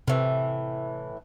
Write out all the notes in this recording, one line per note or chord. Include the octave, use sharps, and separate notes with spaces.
A2 C3 E3